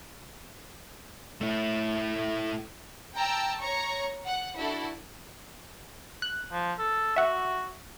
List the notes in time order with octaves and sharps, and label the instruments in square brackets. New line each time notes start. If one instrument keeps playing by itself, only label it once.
[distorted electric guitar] A3 E4
[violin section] G5 A5 A#5 E6
C#5 A#5 C#6
F#5
D4 E4 F#4 A4
[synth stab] F#6
[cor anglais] F3
A4
[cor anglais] F#4 [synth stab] E5 F#5